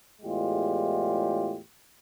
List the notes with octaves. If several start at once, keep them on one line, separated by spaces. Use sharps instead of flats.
E2 A2 G#3 F4 G4